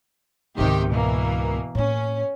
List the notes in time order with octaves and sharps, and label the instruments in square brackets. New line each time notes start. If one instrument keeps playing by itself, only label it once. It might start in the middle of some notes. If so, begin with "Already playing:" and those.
[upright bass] C#2 G#2 [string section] C3 D#3 G4
[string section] B2 E3 A#3
[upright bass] A2 A#3 [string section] C#4